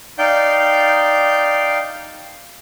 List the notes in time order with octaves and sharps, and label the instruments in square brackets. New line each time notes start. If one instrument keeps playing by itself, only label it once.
[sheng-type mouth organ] D#4 D5 F5 G5 G6